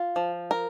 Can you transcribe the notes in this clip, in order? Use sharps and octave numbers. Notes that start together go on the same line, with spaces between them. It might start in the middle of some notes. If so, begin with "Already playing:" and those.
Already playing: F4
F3
A#4